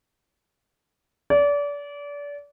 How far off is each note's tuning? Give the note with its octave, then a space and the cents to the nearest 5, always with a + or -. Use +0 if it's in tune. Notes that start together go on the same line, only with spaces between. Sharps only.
D5 -30